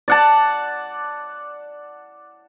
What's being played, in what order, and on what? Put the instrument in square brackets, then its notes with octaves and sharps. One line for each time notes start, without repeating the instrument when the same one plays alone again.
[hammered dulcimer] D5 F#5 A5